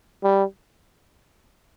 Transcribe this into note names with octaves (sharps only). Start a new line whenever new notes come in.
G3